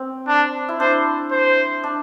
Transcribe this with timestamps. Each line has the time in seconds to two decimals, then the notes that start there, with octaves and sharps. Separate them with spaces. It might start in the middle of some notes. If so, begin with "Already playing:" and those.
Already playing: C4
0.27 D4
0.69 E4
0.79 D4 C5
1.31 C5
1.83 D4